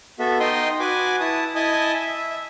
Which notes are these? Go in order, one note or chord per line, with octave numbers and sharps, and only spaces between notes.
B3 F#4 A4 E5
D#4 D#5 G5 C6 D#6
F#4 B4 G#5 D6
E4 A5 D#6
E4 D#5 G#5 A5 D#6
E5